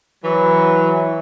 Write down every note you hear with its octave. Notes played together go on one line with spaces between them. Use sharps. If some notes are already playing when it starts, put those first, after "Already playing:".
E3 F#3